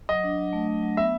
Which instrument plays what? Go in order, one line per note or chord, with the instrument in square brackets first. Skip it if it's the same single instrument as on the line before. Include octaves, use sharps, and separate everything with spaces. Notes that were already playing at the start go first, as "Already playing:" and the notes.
[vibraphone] F#3 [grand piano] D#5
[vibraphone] D4
F#3
A3
F#3
F#3
[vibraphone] B3 [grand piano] E5